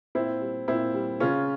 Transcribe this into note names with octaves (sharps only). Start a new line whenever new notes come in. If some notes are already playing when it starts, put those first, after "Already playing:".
A#2 C4 E4
G3
A#2 C4 E4
G3
C#3 C#4 F4